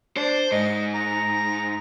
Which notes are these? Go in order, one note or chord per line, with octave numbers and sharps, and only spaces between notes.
D4 C5
G#2 D#5
A#5